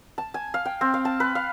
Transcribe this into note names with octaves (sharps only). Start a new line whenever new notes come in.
A5
G#5
F5
G5
C4
F5
A5
B4
F5